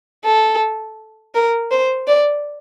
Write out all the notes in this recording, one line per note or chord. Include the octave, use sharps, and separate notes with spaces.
A4
A#4
C5
D5